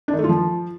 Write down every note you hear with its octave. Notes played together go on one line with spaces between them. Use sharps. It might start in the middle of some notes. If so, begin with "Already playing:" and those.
D4
D#3
A3
F4
F3